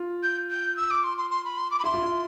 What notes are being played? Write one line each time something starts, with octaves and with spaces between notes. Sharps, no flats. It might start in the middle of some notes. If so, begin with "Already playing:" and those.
Already playing: F4
G6
G6
E6
D6
C6
C6
C6
B5
C6
D6
B5
E4 C6
F4
E4